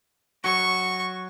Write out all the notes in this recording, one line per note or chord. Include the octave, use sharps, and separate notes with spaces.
F#3 F#4 C#6